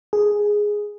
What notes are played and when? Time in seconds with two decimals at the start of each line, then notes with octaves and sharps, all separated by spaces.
0.13 G#4